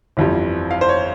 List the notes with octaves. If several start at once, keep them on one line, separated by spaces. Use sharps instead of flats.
G1 F2 E3 G3
F5
C5
C#5